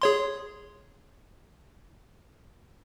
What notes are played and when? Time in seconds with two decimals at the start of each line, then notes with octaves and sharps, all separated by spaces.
0.02 G#4 C#5 C6